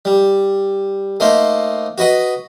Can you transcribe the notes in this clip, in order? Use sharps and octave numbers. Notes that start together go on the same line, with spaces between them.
G3
A3 A#3 D#4 C5
F#4 B4 D#5 F#5